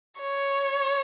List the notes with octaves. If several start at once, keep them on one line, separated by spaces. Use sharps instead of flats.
C#5